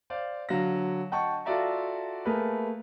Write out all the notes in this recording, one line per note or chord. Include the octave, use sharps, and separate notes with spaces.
C5 D5 F5
D3 F#3 F5 A#6
D#5 F#5 G5 A5 C#6
F4 F#4 A4 D5 E5 A#5
A3 A#3 G#4 A#4 B4